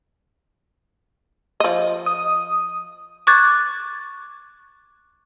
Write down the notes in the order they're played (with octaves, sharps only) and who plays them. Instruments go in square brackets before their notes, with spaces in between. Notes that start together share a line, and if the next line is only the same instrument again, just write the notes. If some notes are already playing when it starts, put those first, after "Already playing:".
[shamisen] F3 D#5
[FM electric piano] D#6
[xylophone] C#6 D6 F#6 G#6 A6